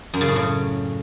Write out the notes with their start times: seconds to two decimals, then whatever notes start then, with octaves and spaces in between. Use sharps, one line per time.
0.14 F#2
0.21 C#3
0.28 A2
0.36 C#3